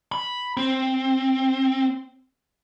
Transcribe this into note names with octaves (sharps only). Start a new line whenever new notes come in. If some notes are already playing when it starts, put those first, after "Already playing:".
B5
C4